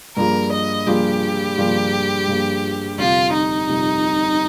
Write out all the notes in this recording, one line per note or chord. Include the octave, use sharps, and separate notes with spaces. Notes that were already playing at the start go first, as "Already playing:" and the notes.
G2 F3 A#3 F4 G#4 A#4
D#5
G2 F3 A#3 F4 G4 G#4
G2 F3 A#3 F4 G#4
G2 F3 A#3 F4 G#4
G1 F2 C3 F4
D#4
G1 F2 C3